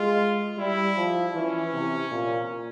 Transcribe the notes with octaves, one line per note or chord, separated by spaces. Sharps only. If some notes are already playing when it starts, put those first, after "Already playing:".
Already playing: G#3 F4
G3 E4
F3
E3 C#4
C3
A#2